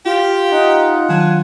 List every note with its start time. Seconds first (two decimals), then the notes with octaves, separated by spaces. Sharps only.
0.06 F4 G4
0.52 D#4 F4 F#5
1.09 D#3 F#3 D4 G#5